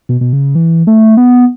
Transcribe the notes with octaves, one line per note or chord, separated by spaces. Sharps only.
B2
B2
C#3
E3
A3
B3